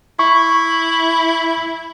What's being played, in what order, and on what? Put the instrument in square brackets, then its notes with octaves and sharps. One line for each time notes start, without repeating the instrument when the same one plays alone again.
[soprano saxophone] E4 [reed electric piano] C#6